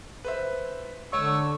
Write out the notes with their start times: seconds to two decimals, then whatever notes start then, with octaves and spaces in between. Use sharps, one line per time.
0.25 B4 C5 E5
1.13 D3 C#5 C#6 E6